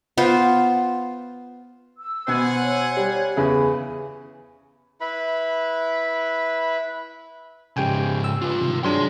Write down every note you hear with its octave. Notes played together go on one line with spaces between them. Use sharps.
B3 F4 C5
E6
B2 C5 F#5 G#5
C#5
G3
E2 C#3
E4 B4 B5
G#2 C#3 G4 G5 G#5
E6
F4 B4
G2 C3 D#3
F#3 D4 G#4 C6